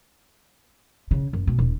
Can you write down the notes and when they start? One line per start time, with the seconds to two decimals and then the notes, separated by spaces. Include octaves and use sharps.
1.11 C#3
1.33 F#1
1.47 B2
1.58 D#1